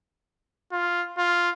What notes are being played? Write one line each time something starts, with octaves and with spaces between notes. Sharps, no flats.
F4
F4